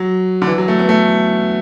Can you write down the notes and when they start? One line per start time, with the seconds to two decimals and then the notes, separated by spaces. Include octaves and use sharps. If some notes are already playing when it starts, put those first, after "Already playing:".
Already playing: F#3
0.42 D3
0.47 E3
0.58 F#3
0.68 A3
0.79 B3
0.89 A3